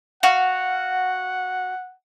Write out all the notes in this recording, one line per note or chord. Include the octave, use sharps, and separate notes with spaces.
F#4 F5 F#5